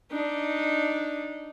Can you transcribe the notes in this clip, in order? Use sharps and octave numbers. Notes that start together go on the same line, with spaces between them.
D4 D#4